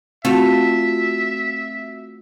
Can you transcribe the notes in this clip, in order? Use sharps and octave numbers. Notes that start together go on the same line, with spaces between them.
A3 C4 F4 F#4 E5 E6